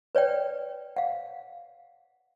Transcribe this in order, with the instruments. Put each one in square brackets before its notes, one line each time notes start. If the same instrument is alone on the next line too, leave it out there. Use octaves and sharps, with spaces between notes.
[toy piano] B4 C#5 D5 G5
F5 F#5